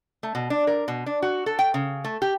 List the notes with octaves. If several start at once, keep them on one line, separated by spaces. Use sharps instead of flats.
A3
B2
D4
A#4
B2
D4
F#4
A4
G5
C#3
A3
G4